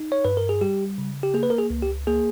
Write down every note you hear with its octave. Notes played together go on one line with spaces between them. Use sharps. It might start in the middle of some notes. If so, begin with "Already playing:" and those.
Already playing: D#4
C#5
G2 B4
A#4
G#4
G3 G4
C#3
G4
A#3 G#4
B4
A#4
G#4
C#2
G4
A#3 G#4